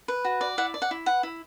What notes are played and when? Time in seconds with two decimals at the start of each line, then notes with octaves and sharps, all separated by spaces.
0.08 B4
0.25 F#4
0.41 D5
0.58 E4 F#5
0.74 D5
0.82 F#5
0.91 E4
1.06 B4 F#5
1.23 E4